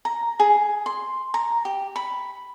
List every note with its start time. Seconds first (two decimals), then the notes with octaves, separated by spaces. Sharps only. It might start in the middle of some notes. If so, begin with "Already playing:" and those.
0.05 A#5
0.40 G#4
0.86 C6
1.34 A#5
1.65 G4
1.96 B5